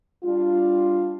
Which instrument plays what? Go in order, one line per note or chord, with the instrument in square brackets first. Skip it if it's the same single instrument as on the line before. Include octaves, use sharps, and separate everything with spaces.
[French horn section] G3 D4 F4